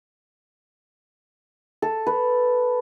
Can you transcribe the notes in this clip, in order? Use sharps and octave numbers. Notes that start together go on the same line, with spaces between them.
A4
B4